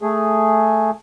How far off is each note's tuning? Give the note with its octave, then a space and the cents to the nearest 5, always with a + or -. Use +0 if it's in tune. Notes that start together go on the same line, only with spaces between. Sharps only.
A3 +0 G#4 +0